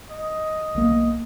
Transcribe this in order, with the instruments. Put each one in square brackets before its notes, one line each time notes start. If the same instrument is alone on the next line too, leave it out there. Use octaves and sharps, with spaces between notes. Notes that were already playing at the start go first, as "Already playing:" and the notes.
[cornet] D#5
[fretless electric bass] B1 E3 A#3